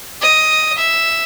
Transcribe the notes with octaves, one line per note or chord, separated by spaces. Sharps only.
D#5
E5